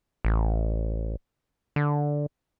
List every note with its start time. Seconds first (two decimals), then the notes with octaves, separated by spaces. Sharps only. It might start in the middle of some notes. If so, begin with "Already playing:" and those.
0.25 A1
1.76 D3